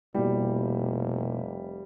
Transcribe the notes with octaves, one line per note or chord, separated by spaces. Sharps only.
F1 B2 G3 A#3 E4